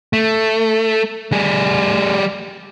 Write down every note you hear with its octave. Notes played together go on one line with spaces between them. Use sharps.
A3
G3 G#4